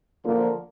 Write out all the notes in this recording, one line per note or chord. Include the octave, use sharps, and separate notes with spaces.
D3 F3 A#3